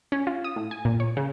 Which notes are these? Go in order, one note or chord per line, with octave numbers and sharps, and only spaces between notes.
C#4
F4
D#6
A2
G#5
A#2
C#5
C#3